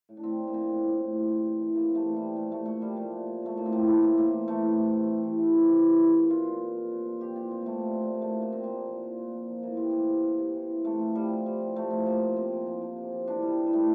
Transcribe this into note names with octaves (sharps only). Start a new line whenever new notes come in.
A2
D4
A2 C4
A2
A#3
F3 C4
A2
A2
A2
C3
C3
E3
E3
C3 A#3
C3 A3
E3
C3 G3
F3 A3
A#2 A3
A#2 A3
A#2 G3
F3 A3
A#2
A#2
F3 A3
A2 A#3
C4
A2 A#3
E3 A3
A2 A#3
A2 A#3
E3
E3 A3
A2
C3
C3
C3
E3
E3
C3
E3
E3
A#2 E4
A#2
A#2 F4
A#2
A#2
F3
A#2
F3
F3 G4
A#2 F4
A#2 C4
A#3
F3 A3
F3 G3
A#2 A3
F3 A#3
A3
A#2
A#2 A#3
A#2 C4
A#3
A#2
F3
F3
A#2
F3
F3
E3 A#3
C3 C4
E3 A#3
C3
C3
C3
E3
C3
C3 A3
F3
F3 G3
F3
F3 G3
F3
C3 A3
F3
F3 A#3
F3
C3 C4
F3
F3
F3
C3
F3
E3 D4
E3 G3
E3
G3
E3 A3